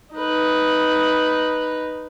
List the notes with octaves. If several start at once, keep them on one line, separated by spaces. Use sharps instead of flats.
D#4 B4